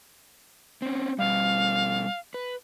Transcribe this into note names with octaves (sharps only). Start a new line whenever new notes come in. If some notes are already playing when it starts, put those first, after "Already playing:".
C4 C#4
B2 G3 F5
B4